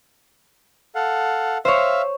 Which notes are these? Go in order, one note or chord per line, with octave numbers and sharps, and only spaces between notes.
A4 F5 F#5
C5 C#5 E5 F5